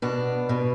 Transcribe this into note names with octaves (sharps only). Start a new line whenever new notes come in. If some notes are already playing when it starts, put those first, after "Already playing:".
B2 D4
B2